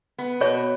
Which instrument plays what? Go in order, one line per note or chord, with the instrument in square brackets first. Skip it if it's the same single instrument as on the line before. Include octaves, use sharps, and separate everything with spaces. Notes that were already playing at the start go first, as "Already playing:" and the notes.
[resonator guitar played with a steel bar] B3
[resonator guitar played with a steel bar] B2 [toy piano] C#5